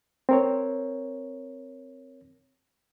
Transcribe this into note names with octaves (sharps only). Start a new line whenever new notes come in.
C4 A#4 C#5